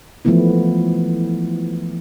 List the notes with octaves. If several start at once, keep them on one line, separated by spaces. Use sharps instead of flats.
E3 F3 G#3 A3 B3 E4